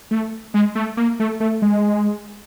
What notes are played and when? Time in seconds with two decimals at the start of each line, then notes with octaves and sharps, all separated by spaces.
0.11 A3
0.54 G#3
0.75 A3
0.97 A#3
1.20 A3
1.40 A3
1.62 G#3